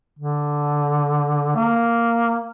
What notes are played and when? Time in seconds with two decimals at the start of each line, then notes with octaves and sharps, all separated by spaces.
0.19 D3
1.56 A#3